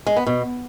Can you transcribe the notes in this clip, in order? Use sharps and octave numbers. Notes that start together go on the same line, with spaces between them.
G#3
B3
B2